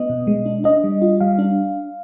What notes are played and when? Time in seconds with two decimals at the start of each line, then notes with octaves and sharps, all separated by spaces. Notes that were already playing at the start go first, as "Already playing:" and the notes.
Already playing: B3 D#5
0.10 B2
0.27 G#3
0.46 D4
0.64 D4 D#5
0.84 G3
1.02 F4
1.21 G3 F5
1.39 D4